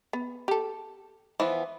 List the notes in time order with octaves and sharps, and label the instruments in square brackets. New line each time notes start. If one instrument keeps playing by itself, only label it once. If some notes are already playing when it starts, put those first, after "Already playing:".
[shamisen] B3
G4 A4
[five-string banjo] E3 F3 B3